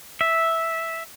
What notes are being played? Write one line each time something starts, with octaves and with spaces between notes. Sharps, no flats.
E5